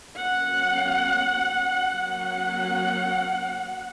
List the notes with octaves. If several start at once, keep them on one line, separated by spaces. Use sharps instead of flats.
F#3 A#3 C#4 F#5
F#3 A#3 C#4 F#5